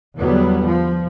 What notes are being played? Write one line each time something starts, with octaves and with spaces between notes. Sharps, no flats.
E2 D3 F#3 G3 B3
F3